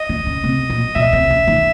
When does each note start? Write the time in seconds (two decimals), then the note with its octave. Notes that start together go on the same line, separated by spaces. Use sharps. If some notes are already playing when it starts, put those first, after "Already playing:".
Already playing: D#5
0.09 D3
0.27 C#3
0.44 C3
0.70 A#2
0.95 B2 E5
1.13 C3
1.30 C#3
1.47 D#3